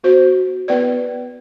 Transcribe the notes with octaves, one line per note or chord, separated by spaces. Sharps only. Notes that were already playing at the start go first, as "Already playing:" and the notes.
B3 F#4 C5
B3 E4 B4 D5